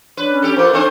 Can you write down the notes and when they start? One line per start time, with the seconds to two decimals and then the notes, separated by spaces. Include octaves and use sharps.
0.17 D4 B4 C#5
0.29 C#4
0.42 G4 A4
0.56 A3 A#3 F4 B4 C5 D6
0.73 C4 D4 D#4 A4 C5 A5